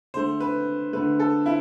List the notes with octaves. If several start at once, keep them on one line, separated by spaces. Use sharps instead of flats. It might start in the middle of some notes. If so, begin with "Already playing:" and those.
D3 A3 C5
B4
D3 A3 B4
A4
E4